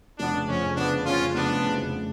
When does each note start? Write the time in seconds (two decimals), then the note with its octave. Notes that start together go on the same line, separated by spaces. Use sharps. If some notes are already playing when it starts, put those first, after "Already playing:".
0.19 F1 B3 D4
0.34 C#3
0.48 F2 C#4
0.63 C#3
0.77 C#3 B3 D4
0.92 F1
1.06 F2 C#4 F4
1.20 C#3
1.34 F1 B3 D4
1.49 C#3
1.64 C#3
1.78 F1